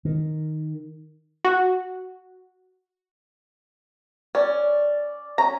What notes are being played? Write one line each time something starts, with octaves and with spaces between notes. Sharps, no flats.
D#3
F#4
C#4 D5
C#4 G#5 A#5